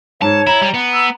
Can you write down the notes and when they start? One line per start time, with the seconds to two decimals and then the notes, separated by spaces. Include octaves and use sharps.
0.22 G#2 C#5 A5
0.47 E4 A#5
0.62 G3
0.74 B3
0.94 E6